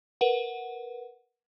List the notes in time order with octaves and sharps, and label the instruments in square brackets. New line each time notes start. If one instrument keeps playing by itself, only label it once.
[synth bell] A#4 B4 F#5